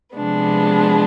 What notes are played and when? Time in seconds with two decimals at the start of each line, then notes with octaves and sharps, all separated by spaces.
0.16 C3 F3 G#3 B3 D4